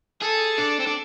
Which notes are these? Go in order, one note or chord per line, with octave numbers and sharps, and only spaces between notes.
G#4 A4
D4
C4
D4